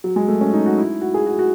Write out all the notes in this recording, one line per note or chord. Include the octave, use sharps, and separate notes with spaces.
F#3
G#3
A3
C#4
D#4
F#4
E4
F#4
G#4
F#4
F#4